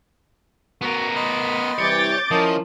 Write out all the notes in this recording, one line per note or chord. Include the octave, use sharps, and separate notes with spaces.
B3 F#4 A#4
D#5 B5 C6
C3 E3 G3 C#5 D6 G6 A6
F3 C#4 E4 A#4 D#5 D#6